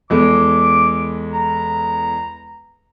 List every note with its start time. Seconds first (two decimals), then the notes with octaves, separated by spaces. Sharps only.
0.10 E2 G#3 A4 D6
1.33 A#5